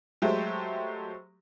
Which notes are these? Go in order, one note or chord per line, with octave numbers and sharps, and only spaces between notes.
F#3 G#3 A3 G4 C5